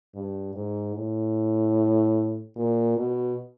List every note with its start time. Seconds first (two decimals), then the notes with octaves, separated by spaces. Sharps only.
0.15 G2
0.55 G#2
0.95 A2
2.56 A#2
2.97 B2